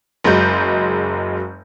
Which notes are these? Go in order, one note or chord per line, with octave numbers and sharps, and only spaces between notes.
F#1 F#3 G#3 G6